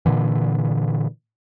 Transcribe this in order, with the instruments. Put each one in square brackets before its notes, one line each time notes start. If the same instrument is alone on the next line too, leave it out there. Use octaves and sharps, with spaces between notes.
[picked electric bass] A#2 D3 E3